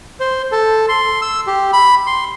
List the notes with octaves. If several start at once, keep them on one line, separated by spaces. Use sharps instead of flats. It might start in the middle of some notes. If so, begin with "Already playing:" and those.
C5
A4
C6
E6
G4
B5
C6